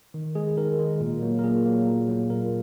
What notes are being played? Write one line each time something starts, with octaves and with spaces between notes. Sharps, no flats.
D#3
G#3 G#4
D#3 A#4
G#3
A#2
F#3 A#3
A#4
A#2 G#4
F#3 A#3
A#2
F#3 A#3
A#2 A#4